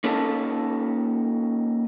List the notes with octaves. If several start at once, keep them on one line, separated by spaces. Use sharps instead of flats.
A#3 C#4 D#4 A4 F5 A5